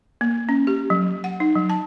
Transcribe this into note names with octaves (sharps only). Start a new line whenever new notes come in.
A#3
C#4
G4
F#3
F#5
D#4
F#3
A5